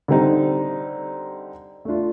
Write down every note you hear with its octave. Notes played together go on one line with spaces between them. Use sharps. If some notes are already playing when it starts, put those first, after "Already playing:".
D3 G3 C4 D#4
A3 D4 F4